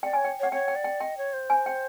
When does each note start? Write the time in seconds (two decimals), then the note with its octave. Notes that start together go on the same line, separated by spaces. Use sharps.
0.03 D5 G5
0.13 C#5 G#5
0.25 G5
0.40 C#5 F#5
0.52 C#5 G5
0.68 G5
0.76 D5
0.84 G5
1.01 D#5 G5
1.17 C#5
1.33 C5
1.50 G#5
1.66 G5